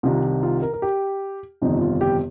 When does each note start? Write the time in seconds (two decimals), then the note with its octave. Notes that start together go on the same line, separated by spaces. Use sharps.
0.03 C2 C3 D#3 F4
0.43 F4
0.62 A#4
0.73 A#4
0.82 G4
1.62 G1 F2 C3 D#3 D#4
1.81 F4
2.01 G4